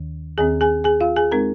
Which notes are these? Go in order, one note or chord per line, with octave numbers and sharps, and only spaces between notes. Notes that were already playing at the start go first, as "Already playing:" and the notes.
Already playing: D#2 D#3
D#2 D#3 C4 G#4 G#5
G#4 G#5
G#4 G#5
F4 F5
G#4 G#5
G#3 C4 D#4 A#4 A#5